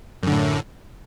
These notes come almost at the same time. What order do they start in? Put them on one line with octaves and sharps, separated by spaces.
F#2 D3 A2